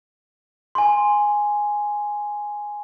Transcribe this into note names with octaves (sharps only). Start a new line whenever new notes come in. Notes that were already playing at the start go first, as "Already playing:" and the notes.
G#5 C6